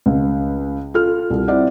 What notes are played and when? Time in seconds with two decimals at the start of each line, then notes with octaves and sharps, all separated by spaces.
0.06 C#2
0.94 F4 A4 F6
1.30 C2
1.48 C4 E4 D5 F#5